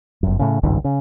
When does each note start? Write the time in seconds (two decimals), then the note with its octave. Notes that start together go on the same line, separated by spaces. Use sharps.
0.23 G1 F#2
0.39 A2 C#3
0.63 G#1 C#2 G2 D#3
0.84 C#3